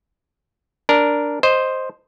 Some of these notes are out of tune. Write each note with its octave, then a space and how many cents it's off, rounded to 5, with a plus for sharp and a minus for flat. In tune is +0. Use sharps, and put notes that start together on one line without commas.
D4 -5 A#4 +0
C5 +0 D#5 +0